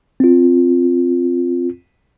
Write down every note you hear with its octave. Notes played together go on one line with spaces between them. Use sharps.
C4 F4